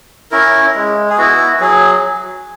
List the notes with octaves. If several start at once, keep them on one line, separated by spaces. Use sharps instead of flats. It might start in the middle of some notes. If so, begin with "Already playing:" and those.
C#4 E4 A#4
G#3
G#4
B3 E4 F#4
F#3 G#4